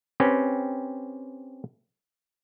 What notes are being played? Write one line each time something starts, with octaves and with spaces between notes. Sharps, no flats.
C4 C#4 G4 B4